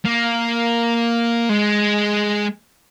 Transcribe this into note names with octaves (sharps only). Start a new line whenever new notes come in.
A#3
G#3